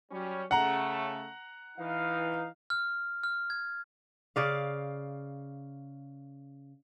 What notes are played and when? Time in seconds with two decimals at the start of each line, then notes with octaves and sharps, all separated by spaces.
0.11 F#3 G3 C#4
0.51 C#3 A3 F#5 A#5
1.78 E3 D#4 F5
2.70 F6
3.24 F6
3.50 G#6
4.36 C#3 D5 F5